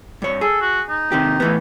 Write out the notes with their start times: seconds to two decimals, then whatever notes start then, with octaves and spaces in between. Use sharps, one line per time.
0.22 G2 C#5
0.41 G#4 A4
0.61 F#4
0.89 D#4
1.12 C3 D#3 G4
1.40 A2 E3 B3